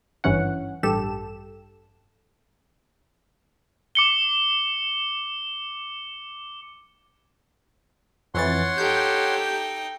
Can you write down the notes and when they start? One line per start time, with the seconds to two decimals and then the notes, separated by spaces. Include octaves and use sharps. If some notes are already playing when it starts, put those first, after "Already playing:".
0.24 G#1 G2 E3 C#4 F#5
0.83 A1 G2 G4 A4 E7
3.95 D6 C#7 G7
8.35 F2 E3 C#5 F#5 C6 A6
8.78 D#4 G4 A4 G5 G6